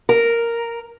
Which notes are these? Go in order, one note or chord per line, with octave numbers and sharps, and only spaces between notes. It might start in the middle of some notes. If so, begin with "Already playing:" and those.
A#4